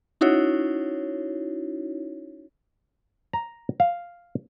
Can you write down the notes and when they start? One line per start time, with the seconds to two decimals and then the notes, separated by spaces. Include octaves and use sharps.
0.21 C#4 D#4 E4 F#4 C#5
3.33 A#5
3.80 F5